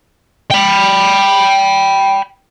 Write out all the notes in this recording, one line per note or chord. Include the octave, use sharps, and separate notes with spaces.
G5 B5